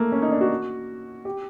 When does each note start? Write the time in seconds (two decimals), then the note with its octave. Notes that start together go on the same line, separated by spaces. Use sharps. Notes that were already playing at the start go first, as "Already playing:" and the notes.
Already playing: A3 A#3
0.12 C#4
0.22 D#4
0.32 D4
0.41 F#4
1.25 G4